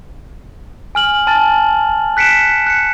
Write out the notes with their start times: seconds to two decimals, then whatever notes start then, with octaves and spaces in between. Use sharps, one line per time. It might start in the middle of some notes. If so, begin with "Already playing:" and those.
0.95 G#5 F6 F#7
1.27 G#5 A5 F6 A6
2.17 F#6 B6 C#7 D7 E7
2.67 F#6 C#7